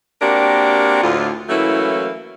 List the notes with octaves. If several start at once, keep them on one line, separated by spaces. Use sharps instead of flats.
A#3 C4 D4 F#4 G4 A#4
D2 A2 F4
E3 F#3 A3 A#3 C#4 E4